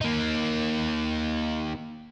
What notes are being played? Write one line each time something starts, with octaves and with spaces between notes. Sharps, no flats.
A#3 D#4